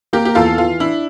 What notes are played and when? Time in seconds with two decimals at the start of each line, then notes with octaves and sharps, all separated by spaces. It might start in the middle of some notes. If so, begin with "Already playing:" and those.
0.13 A#3 G4 A#4
0.25 G4
0.35 E2 F4 A4
0.58 E3 F4
0.80 D4 E4